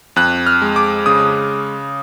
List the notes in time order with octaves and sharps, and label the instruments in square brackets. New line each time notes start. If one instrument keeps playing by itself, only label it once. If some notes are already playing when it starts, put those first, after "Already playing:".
[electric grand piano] F2 F#6
F6
G#3
D6
C#3 D#6